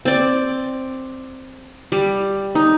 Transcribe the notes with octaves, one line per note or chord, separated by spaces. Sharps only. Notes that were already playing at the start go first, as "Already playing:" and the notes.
C4 D5
G3
D#4